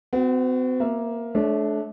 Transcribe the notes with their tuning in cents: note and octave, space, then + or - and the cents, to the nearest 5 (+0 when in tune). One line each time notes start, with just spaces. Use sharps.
C4 -45 F#4 +0
A#3 +10 E5 +15
A3 -35 D4 +0 C#5 +0